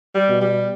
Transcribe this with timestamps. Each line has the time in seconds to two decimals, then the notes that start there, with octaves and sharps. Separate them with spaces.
0.15 G3
0.29 B2
0.41 G3